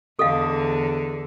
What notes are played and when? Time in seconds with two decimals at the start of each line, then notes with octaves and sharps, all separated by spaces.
0.19 E2 D3 A4 D#5 F5